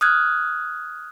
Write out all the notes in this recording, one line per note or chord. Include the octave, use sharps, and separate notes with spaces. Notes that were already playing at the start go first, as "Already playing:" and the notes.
D#6 F6 F#6 G#6